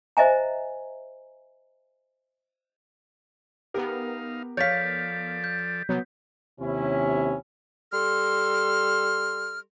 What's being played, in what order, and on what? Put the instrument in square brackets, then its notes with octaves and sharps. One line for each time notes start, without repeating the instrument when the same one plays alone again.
[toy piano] C5 D#5 E5 G#5 A#5
[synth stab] B3 A#4 [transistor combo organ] D#4 F5 [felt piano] G4
[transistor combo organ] F3 A4 D5 [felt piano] C#5 F5 [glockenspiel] G6 A6 B6
[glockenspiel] G6
[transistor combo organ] C3 G3 [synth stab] F#3 B3
[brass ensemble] D#2 C3 C#4 E4
[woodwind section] G3 A4 C6 F6